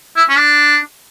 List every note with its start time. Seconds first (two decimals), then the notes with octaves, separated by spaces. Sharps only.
0.16 E4
0.29 C#4
0.37 D4